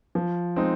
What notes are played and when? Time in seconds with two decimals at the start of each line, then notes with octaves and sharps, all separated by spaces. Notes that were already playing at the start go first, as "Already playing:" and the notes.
0.15 F3
0.56 G#3 C4 D#4